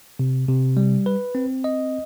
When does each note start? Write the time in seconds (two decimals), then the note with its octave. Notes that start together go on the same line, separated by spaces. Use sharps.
0.19 C3
0.48 C3
0.77 G3
1.06 B4
1.35 C4
1.64 D#5